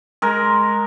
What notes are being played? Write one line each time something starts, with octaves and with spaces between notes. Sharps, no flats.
G#3 A#4